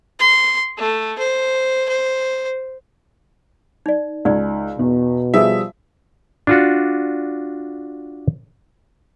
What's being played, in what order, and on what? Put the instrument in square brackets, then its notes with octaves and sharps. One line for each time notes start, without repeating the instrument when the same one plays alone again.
[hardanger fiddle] C6
A3
C5
C5
[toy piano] D#4 D5
[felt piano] C#2 [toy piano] D#4 D5
[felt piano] E2 [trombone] B2
[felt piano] F3 G3 G#4 [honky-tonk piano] E5
[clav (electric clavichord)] D4 F4 F#4